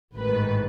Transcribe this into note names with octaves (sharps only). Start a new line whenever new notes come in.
A1 G#2 D#3 B4